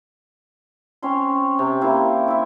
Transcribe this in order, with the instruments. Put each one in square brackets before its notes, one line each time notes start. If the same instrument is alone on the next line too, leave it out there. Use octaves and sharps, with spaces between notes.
[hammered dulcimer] C4 C#4 C#5 C6
C3
A#3 E4 C5 F5
E4 E5